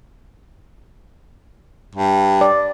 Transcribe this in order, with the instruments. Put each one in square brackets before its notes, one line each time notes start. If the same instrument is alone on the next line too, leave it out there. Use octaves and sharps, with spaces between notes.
[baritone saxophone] G2
[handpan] D5